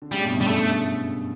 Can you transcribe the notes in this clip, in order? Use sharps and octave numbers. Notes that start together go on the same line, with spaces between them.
D3
A2 C#3 G3
G2 B2
F#2
G3
F#2 A3